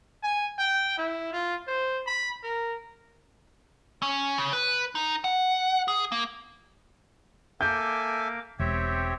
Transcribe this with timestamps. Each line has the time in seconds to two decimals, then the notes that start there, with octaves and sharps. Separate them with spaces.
0.23 G#5
0.58 G5
0.98 E4
1.33 F4
1.67 C5
2.07 B5
2.43 A#4
4.02 C#4
4.38 C#3
4.53 B4
4.95 D#4
5.24 F#5
5.88 G#4
6.12 A#3
7.61 A#3 A4 E5 G#5 D6 G6
8.59 E1 C4 G4 C#5 E5